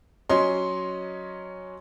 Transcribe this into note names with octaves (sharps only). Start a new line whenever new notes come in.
F#3 C#4 D#5 C6